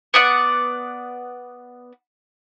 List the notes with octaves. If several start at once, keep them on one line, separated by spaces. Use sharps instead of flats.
B3 D5 F#5